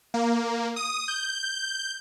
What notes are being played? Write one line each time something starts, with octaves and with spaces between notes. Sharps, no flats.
A#3
D#6
G6